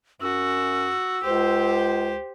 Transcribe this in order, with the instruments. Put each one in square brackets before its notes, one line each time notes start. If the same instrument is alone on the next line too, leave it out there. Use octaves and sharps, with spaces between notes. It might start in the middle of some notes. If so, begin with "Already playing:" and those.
[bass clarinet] F#2 [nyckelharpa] F#4 [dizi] E6
[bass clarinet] C#2 [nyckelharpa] G4 C5